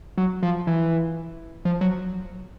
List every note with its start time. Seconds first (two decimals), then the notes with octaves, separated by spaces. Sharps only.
0.18 F#3
0.43 F3
0.67 E3
1.65 F3
1.81 F#3